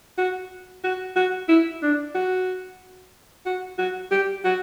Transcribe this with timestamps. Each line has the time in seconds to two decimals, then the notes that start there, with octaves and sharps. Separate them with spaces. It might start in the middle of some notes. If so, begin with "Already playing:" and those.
0.18 F#4
0.84 F#4
1.16 F#4
1.48 E4
1.82 D4
2.14 F#4
3.46 F#4
3.78 F#4
4.11 G4
4.44 F#4